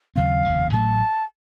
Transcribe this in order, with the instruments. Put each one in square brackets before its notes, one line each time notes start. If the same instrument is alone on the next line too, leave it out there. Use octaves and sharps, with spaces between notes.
[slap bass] D#2 C#3 F#3 C4 [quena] F5
[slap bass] F1 D#2 C#3
[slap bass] A1 A2 F#3 A3 [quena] A5